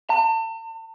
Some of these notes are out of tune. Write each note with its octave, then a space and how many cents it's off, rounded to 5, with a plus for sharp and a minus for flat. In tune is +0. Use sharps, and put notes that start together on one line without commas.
A5 +40